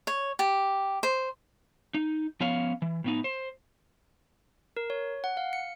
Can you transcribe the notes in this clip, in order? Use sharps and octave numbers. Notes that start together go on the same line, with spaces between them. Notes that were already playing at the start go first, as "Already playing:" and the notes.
C#5
G4
C5
D#4
F3 B3 C#4 C#5 F5
E3
A2 B3 D#4
C5
A#4
C#5
F#5
F5
C#7